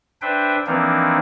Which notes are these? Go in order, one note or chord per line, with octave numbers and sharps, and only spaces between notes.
D4 B4 C5 E5 G5
E3 F3 A#3 C4 D4 D#4